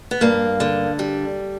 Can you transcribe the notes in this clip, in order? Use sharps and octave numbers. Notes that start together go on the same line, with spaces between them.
B3
G2 A#3
D3
G3